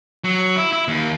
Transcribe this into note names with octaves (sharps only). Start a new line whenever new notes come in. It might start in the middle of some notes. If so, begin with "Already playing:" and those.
F#3
E4
E4
D#2